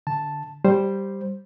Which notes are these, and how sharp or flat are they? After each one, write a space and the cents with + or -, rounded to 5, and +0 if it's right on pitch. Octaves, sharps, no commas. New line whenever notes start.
D3 +0 A5 +0
G3 +0 C5 +5